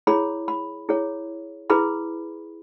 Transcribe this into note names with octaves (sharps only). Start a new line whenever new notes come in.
E4 G#4 C#5 B5
B5
E4 G#4 C#5
E4 G#4 B4 B5